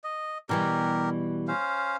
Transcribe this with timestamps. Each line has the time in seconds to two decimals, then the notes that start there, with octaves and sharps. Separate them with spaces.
0.04 D#5
0.49 B2 E3 G3 G4 A#4
1.48 C#4 C5 F5